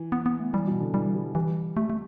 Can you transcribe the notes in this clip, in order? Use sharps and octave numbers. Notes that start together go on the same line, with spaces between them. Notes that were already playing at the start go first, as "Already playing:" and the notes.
Already playing: E3
B3
B3
A3
E3 G3
B2
D3
E3 G3
E3 G3
E3 G3
G3 A3
A3